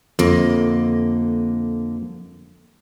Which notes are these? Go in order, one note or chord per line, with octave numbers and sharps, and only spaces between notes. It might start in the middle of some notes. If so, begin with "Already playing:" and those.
F2 D3 A#3 D#5